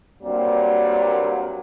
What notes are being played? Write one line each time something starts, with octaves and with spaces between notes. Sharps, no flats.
G2 A#2 F#3 G3 A#3 C4